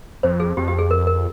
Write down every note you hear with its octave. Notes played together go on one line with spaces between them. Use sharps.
F2 C5
G#4
F2 G4
G4
G#4
A#4
A#4